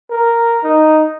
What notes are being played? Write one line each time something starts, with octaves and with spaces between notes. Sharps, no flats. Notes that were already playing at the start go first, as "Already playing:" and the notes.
A#4
D#4